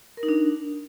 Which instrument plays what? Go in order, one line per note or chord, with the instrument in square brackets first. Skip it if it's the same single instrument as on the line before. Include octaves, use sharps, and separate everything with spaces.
[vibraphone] A#4
D#4
D4